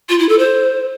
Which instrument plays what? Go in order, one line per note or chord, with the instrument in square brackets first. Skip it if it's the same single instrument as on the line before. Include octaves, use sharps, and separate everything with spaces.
[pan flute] F4
E4
A4
C5